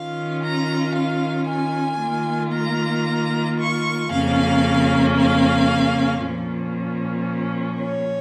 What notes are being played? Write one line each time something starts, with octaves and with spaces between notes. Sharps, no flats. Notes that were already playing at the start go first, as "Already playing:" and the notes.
Already playing: D#3 C#4 F4 F5
A#5
F5
G#5
D#3 A#3 F4
A#5
C#6
F2 C#3 A#3 C#4 F5
F5
A#2 F3 C#4
C#5